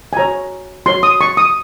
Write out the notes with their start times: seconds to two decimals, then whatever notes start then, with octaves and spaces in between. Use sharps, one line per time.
0.13 G#5
0.17 F#4 C#5 A#5
0.86 F#4 C#5 C6
1.03 D#6
1.21 C#6
1.37 D#6